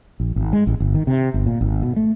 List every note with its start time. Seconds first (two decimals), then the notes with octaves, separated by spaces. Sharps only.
0.20 A#1
0.36 G#1
0.53 G#3
0.67 A1
0.80 G1
0.95 D#3
1.07 C3
1.34 G1
1.46 A#2
1.61 G#1
1.82 B2
1.96 A3